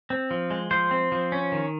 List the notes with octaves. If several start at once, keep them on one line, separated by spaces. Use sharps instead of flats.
C4
F3
G#3
F3 C5
C4
F3
C#4
D#3